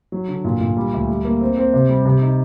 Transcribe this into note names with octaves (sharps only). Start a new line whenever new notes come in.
F#3
D3
A#2
A#2
G3
D2
G3
A#3
C4
C4
C3
G3
C3
D#4